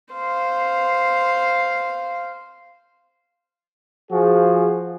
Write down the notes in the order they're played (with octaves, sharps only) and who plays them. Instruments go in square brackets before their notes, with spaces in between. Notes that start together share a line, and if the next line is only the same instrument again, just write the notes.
[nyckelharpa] C5 F5
[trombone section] F3 F#4 G#4